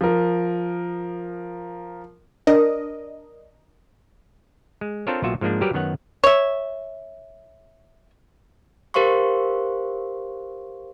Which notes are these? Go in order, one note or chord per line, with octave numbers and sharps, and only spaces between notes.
F3 A#4
D4 A#4 D#5
G#3
C4 D4 F4 A4 A#4 C#5
B1 A#2 F4 F#4 E5
G#2 F3 G#3 A#3 D4
F#3 G3 G4 A#4 B4
F#2 D#3 B3 C#5 F#5
C#5 E5
G4 A#4 C5 F5 C6 C#6